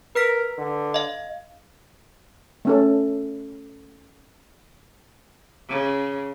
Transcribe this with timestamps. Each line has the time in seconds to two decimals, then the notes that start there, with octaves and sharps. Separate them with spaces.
0.15 A#4 B4 F6 B6
0.58 D3
0.94 D#5 F5
2.65 A3 C#4 A4
5.69 C#3